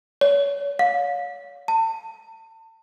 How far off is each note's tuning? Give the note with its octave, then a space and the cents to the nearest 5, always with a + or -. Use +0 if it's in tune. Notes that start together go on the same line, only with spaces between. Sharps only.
C#5 +35
F5 +30
A5 +35